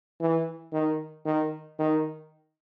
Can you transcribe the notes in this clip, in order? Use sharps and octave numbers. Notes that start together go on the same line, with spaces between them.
E3
D#3
D#3
D#3